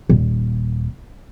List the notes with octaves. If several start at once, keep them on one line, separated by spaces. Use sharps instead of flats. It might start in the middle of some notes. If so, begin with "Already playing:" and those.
D#1